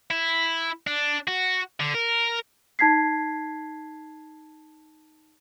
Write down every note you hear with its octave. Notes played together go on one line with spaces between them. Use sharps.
E4
D4
F#4
D3
A#4
D#4 A5 G#6 B6 C7